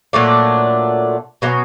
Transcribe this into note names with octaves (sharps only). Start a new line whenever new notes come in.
A#2 F#3 A3 D4
B2 F#3 A#3 C#4